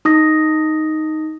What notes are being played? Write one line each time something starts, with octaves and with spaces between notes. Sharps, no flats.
D#4 D#6 A#6